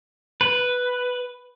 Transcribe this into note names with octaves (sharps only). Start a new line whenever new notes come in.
B4